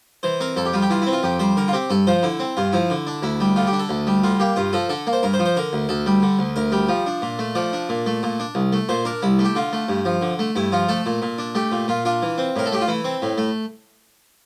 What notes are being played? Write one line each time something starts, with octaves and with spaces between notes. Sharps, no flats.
E3 C5
C4 A#4
F2 A4
G4
G3 F4
G4
E3 F4
C4 E4
F4
F2 G4
G3 C5
D3 A#4
F4
C4 G4
G2 A4
F3 C5
D3 E4
C4
G2 F4
F3 E4
D3
D4
D2 E4
G3
D3 F4
G4
D4
A4
D2
G3
D3 F4
A#3 G4
G2 F4
F3 A4
D3 A4
A#3
C5
G2 A#4
C5
F3
C5
D3 A#4
D2
D2 A4
G3
D3
D2
D2 A#4
G3
F3
D4
A#2
A3
F3 D5
D4
A#2
A3
A#2
D4
C2
A3
A#2 C5
D4 A#4
C2 E4
A3
G4
D3 F4
A3
G2
F3
D3
A3
G2 E4
F3 F4
A3 A4
A#2
A#2
D4
A3 G4
A#2
A#2 F4
D4 F4
E3
C4
A2 A#4
A4
A3 G4
F4
E3 E4
C4
A2
A3